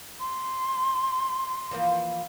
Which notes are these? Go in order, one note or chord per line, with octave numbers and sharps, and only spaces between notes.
C6
E3 F3 A#3